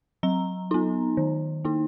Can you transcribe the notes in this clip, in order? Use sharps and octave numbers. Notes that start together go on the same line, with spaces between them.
F#3 A#5
B3 D#4
D#3
A#3 D#4